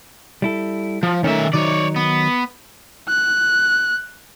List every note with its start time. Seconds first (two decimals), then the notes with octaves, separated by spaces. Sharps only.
0.42 G3 E4 A4
1.03 F3
1.24 D#3 A3 C#4 E5
1.54 D#3 F#3 D#4 C#5 D5
1.96 B3
3.09 F#6